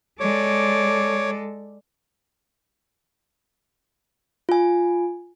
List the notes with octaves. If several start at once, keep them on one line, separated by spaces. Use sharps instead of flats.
G#3 A4 C#5 D5 D6
F4 G#5